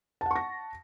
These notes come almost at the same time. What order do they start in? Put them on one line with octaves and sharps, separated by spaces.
A5 F#5 C#6 A#6